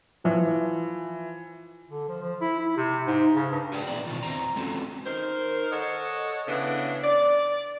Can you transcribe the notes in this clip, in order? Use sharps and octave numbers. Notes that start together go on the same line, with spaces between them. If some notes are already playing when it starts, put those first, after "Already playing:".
E3 F3
D3
F3
F3
E4
E4
C3
G#2
C#3
G2
F#4 G#4 C5 D5 G5
A#2 E3 G#3 B3 D5
B2 D#3 F4
E2 C4 A#5
G#3 C4 C#4 F4 F#4 A4
D#3 A#4 C5
A4 C#5 D#5 F#5
C#3 E3 B3 D4
D5